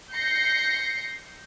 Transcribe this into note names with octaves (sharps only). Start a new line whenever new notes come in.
G6 A#6 C7 C#7